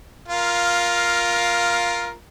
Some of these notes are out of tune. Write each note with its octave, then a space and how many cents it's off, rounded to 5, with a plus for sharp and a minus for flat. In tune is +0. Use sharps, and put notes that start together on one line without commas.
F4 +0 A#4 +10 F5 +0